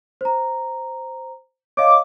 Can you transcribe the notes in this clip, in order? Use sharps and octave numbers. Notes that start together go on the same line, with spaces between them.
C5 A#5
C#5 D#5 F5 D6